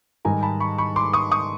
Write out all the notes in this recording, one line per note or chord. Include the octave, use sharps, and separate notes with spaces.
G#2 D#3 G3 G#5 A#5
A5 B5
B5 C#6
B5 C#6
C6 D6
C#6 D#6
C#6 D#6